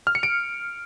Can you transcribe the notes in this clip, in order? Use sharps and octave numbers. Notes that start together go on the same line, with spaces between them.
F6
C#7
D7